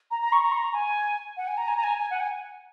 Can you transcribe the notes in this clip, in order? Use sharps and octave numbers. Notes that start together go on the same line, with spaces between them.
A#5
A#5
C#6
A#5
C#6
A#5
G#5
F#5
G#5
A#5
G#5
A#5
G#5
G#5
F#5
G#5